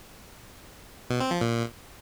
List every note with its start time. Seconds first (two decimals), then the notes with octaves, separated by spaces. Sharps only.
1.10 B2
1.20 C4
1.31 F3
1.41 A#2